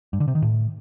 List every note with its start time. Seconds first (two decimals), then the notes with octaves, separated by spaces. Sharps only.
0.13 G2
0.20 D3
0.28 C3
0.35 D#3
0.42 A2